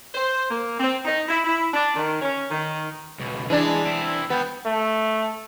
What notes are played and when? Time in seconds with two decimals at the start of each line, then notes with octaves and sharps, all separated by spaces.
0.15 C5
0.51 A#3
0.79 C4
1.05 D#4
1.29 E4
1.45 E4
1.74 D4
1.96 D#3
2.22 C#4
2.51 D#3
3.20 C#2 B2
3.50 E3 G#3 D4 G#4
3.86 C4 E4
4.30 B3 B4 G5
4.65 A3